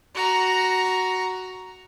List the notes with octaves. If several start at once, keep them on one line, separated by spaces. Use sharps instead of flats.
F#4 A#5